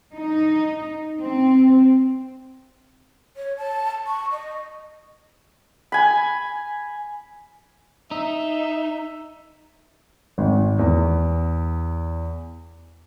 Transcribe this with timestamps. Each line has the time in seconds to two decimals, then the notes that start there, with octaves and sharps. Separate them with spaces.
0.15 D#4
1.20 C4
3.37 C#5
3.58 A5
4.07 C#6
4.31 D#5
5.92 G#5 B5
8.11 D#4 E5
10.38 G#1
10.79 E2